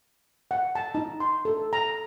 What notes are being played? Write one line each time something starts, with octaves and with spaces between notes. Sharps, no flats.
F#5
A5
D#4
C6
A4
A#5